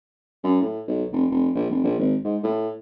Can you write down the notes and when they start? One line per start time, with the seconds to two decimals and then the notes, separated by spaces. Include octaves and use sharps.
0.44 F#2
0.62 A2
0.88 B1
1.12 F1
1.30 F1
1.55 A#1
1.70 F1
1.83 A#1
1.99 G#1
2.24 G#2
2.43 A2